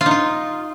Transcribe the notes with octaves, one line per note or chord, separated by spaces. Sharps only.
F4
D#4
F4